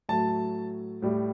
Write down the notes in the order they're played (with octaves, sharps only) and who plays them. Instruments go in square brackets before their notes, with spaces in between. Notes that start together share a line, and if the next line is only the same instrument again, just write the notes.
[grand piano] A2 F#3 A3 A5
A2 G3